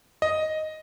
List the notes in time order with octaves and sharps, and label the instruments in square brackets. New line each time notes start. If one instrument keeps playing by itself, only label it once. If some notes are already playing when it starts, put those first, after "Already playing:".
[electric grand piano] D#5